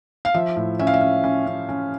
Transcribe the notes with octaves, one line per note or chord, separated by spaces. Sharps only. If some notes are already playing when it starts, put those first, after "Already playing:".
F5
F3 E5
A2
C#4 E5
F5
E5
C#4
C#4
C#4
C#4